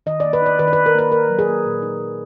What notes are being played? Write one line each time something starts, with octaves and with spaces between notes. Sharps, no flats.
D#3 D#5
A#3 D5
B4
D#4 D5
D#3 B4
D5
D#3 B4
A#4
A#3 B4
D#4 A#4
F#3
G#4
A#3
A#2
D#4
F#3